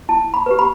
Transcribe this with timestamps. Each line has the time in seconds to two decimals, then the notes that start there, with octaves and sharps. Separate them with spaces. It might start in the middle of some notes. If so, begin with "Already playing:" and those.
0.09 E4 A5
0.34 B5
0.46 G4 B4
0.59 B5